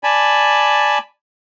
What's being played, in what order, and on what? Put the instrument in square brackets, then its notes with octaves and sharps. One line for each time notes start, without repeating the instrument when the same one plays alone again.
[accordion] D5 G#5 A5 B5